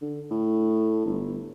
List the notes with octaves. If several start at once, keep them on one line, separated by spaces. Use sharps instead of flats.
D3
A2
G1